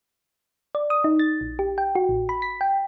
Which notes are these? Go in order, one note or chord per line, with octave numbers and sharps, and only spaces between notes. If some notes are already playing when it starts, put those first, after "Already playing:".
D5
D#6
D#4
A6
A#1
G4
G5
F#4
A1
B5
B6
G5